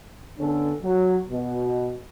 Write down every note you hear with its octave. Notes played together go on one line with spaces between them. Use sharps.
D3 B3 C#4 D4 A4
F#3
B2